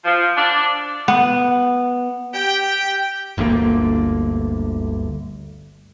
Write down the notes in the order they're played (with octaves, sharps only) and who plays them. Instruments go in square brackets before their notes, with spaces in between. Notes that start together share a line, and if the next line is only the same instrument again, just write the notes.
[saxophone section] F3
D4
[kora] B3
[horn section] G4 G5
[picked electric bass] G1 D2 D3 A#3